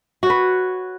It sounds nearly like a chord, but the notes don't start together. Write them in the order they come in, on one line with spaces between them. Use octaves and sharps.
F#4 C#5 B4